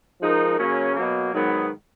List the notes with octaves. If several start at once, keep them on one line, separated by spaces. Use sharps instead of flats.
F3 G#3 D#4 A#4
C#3 F#3 A#3 C#4
B2 F#3 A#3
G#2 D#3 F#3 B3